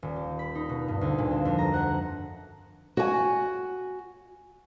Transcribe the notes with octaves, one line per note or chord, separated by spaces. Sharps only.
D#1
G4
B5
D#4
B2
G2
D2
A#2
C4
F2
A#5
F#5
F#4 G#5